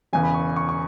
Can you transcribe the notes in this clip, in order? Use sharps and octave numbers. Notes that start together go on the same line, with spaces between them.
E1 E2 C#3 G#5
B5
C#6
C#6
C#6